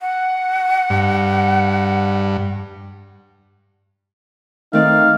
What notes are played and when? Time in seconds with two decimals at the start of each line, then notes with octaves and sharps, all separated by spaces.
0.01 F#5
0.90 G2
4.73 D#3 A3 C4 D#4 D5 F5